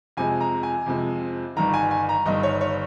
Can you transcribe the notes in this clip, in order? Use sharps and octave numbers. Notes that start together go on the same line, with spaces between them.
F2 C3 F3 G#3 G#5
A#5
G#5
F2 C3 F3 G#3
G1 G2 D#3 A#5
G#5
G#5
A#5
G1 G2 D#3 D#5
C#5
C#5